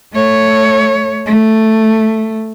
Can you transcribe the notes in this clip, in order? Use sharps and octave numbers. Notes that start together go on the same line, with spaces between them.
A3 C#5
A3